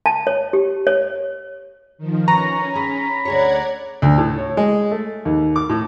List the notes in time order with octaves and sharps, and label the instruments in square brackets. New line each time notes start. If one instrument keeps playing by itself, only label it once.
[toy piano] A5
C#5
G4
C#5
[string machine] D#3 F3
[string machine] C#4 [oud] B4 [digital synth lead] A#5 [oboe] C#6
[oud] G#4 [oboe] B5
[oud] D2 G#4 C#5 [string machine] D5 F#5 G#6
[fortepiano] D2
A2
C#5
G#3
A3
D#2
D6
A2